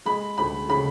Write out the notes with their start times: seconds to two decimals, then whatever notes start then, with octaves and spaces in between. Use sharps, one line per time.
0.05 G#3 B5
0.38 D2 B5
0.69 C#3 B5